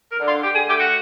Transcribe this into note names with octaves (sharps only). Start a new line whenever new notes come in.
A#4
D3
F4
D3 G4
G#4
A3 G4
F#4